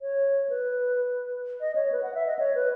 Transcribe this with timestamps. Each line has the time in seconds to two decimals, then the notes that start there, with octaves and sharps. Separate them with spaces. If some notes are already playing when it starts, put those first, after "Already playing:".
0.01 C#5
0.49 B4
1.60 D#5
1.75 C#5
1.92 B4
2.03 F#5
2.14 E5
2.26 D#5
2.39 C#5
2.55 B4